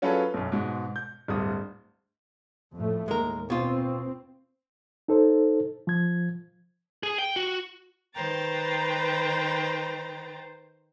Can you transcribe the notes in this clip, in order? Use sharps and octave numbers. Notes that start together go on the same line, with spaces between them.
F#3 C#4 F4 G#4 A4 B4
B1 F#2
G#2 B2 G#3
G6
D1 G2 D#6
F2 A2 A3
D#2 G#3 A#4
B2 C4 F4
D#4 A4 C5
F3 G#6
G#4
G5
F#4
D#3 B4 C5 G5 A#5 A6